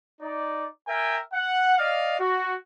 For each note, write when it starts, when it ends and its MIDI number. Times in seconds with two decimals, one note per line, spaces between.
0.21 0.67 63
0.21 0.67 74
0.87 1.18 70
0.87 1.18 76
0.87 1.18 79
0.87 1.18 80
1.32 1.76 78
1.77 2.16 74
1.77 2.16 75
1.77 2.16 77
2.19 2.55 66